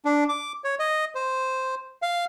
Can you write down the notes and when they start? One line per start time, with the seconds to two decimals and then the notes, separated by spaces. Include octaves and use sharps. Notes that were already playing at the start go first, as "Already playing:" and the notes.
0.05 D4
0.29 D6
0.64 C#5
0.79 D#5
1.15 C5
2.02 F5